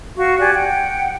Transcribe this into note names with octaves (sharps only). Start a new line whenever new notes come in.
F#4 F5 C#6
G4 D5 G#5 F#6
F#5 G5